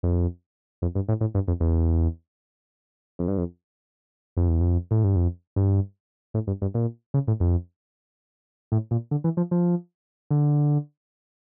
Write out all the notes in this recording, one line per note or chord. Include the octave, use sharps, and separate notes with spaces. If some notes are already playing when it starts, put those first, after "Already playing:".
F2
F2
G2
A2
A2
G2
F2
E2
F2
G2
F2
F2
E2
F2
A2
G2
F2
G2
A2
G2
G2
A#2
C#3
A2
F2
A2
A#2
D3
E3
F3
F3
D3